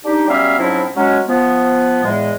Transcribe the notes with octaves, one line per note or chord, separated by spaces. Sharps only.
D4 D#4 G4
F#3 G3 B3 C#4 E5 F5
G#2 F3 F#3 C4 C#4 E4
F#3 G#3 C#4
F3 B3
E2 A2 G#3